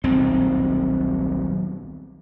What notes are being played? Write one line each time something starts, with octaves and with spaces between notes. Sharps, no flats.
D#1 B1 C4